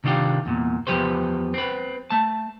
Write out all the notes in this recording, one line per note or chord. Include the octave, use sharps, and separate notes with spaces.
C3 D#3 D4 F4 G4
E2 A#2
E2 G#2 F3 G4 B4 C5
C4 B4
A3 A5